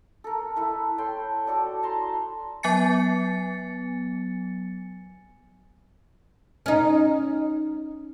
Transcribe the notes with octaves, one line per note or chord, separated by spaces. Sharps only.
A4 A#4
A3 E4 B4
A4 C#5 G5 C6
F#4 A4 D5
A5 A#5 C6
F#3 B3 G#5 A6 C#7
C#4 D#4